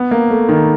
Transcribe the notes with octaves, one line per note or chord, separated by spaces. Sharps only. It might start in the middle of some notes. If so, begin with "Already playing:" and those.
Already playing: B3
A#3
A3
D#3